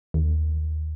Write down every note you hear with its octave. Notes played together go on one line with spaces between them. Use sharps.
D#2